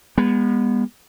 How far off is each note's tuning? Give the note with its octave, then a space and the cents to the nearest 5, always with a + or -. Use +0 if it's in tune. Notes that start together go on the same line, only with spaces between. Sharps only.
G#3 -40 B3 -25